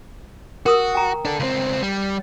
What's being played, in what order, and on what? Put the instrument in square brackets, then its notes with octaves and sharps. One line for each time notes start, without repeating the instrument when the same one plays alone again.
[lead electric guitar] F#4 [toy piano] A#4 D#6 E6
[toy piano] G5 A#5
[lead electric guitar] D4 A4
C#2 C4
G3